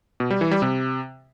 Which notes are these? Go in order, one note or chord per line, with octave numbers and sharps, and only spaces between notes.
B2
G3
E3
G3
C3